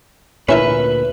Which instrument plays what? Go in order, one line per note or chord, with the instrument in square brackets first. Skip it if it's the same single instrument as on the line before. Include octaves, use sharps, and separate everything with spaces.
[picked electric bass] D2 A#2 [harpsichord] C#4 E4 A#4 [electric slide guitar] B4